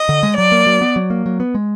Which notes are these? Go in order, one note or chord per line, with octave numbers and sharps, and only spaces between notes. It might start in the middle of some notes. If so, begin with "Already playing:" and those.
Already playing: D#5
D3
G#3
F#3 D5
A#3
F#3
B3
F#3
A#3
F#3
B3
G#3